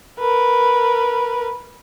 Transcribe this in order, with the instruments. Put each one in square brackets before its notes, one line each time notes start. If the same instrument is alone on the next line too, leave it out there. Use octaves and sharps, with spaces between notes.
[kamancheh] A#4 B4